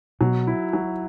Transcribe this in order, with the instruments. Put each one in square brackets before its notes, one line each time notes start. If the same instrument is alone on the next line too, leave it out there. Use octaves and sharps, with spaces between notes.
[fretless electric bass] B2 [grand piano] F#3
[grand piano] E4
F#3